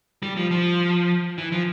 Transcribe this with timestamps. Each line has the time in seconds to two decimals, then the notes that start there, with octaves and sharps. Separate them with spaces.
0.23 G3
0.37 F3
0.51 F3
1.38 E3
1.52 F3